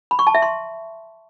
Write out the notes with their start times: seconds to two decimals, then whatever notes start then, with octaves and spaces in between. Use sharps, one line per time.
0.11 B5
0.19 C#6
0.27 A5
0.35 E5
0.42 C6